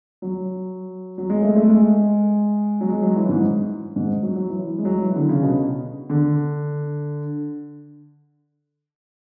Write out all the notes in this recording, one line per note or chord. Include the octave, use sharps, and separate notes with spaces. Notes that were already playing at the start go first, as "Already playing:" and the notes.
F#3
F#3
G#3
A3
A3
G#3
F#3
G#3
F#3
E3
G#2
G#2
F#3
F#3
E3
G#3
F#3
E3
D3
C#3
B2
D3